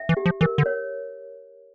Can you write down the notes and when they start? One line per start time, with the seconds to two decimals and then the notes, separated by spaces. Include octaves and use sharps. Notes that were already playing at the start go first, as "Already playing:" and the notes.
Already playing: E5
0.09 E3
0.17 G4
0.26 F3
0.41 E3 A#4
0.58 D3
0.66 C#5